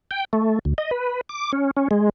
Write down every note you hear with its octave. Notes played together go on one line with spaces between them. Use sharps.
G5
A3
D2
D#5
B4
D6
C#4
C#4
G#3